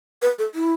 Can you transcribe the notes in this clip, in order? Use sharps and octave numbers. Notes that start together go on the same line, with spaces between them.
B4
A4
E4